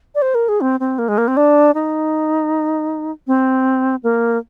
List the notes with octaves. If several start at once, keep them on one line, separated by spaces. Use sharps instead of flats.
D5
C5
A#4
G#4
C4
C4
A#3
G#3
A#3
C4
D4
D#4
C4
A#3